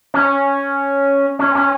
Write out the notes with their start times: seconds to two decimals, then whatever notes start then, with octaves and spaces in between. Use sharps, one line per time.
0.14 C#4
1.39 C#4
1.55 C#4